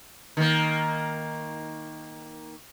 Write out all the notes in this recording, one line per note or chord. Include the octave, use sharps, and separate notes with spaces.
D#3 A#3